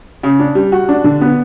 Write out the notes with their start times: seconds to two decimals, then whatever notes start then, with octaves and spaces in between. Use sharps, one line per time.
0.23 C#3
0.39 D4
0.55 G3
0.72 F#4
0.89 D4
1.04 D3
1.21 B3